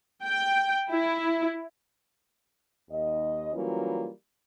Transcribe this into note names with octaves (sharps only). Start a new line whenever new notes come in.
G5
E4
D#2 D#5
E3 F#3 G3 A#3 C#4 F4